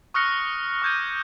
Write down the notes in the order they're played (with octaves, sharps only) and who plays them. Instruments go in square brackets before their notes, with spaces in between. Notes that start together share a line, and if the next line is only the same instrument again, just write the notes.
[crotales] C#6 D#6 F6 F#6 A#6 C#7
C#6 D6 G6 G#6 D#7